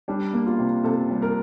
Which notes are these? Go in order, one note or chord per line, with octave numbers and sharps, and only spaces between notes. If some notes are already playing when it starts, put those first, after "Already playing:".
G3 D4
A#3
F4
C3
C3 A4
G3
A#4